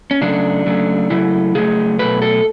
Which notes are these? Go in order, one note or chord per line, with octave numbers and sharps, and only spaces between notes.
C#4
C#3 F#3 A3 D4
C#3 F#3 A3
C#3 F#3 A3 E4
C#3 F#3 A3 G#4
B2 F#3 A3 B4
A4